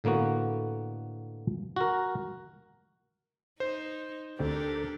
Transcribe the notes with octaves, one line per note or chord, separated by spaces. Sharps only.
A2 D3 A#3 B3 F#4
F#4 A#4
D#4 C5
D2 D3 C4 D4 G4 A4 A#4